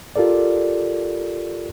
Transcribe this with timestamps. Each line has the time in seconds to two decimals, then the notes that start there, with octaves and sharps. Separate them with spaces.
0.16 F4 G4 A4 A#4 D5